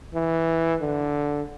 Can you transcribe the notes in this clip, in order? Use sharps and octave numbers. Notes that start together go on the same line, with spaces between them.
E3
D3